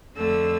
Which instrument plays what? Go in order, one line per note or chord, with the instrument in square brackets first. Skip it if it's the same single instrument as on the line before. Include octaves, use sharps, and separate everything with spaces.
[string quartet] F2 D3 A3 E6